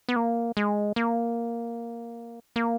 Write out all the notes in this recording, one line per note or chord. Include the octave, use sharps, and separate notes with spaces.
B3
A#3
G#3
A#3
A#3